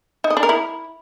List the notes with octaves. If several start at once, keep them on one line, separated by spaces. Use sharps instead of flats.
D#4
D#5
D4
A#4
E4